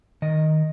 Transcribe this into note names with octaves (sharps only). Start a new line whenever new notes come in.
D#3 D#5